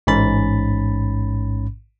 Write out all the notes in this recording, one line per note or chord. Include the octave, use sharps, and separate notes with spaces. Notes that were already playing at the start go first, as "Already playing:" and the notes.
A1 G#2 C#4 B5 A6